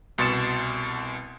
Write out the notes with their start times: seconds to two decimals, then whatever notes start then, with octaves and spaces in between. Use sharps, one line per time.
0.18 C2 B2 C6 A6 C#7 E7